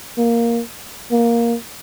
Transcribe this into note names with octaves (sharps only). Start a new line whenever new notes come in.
A#3
A#3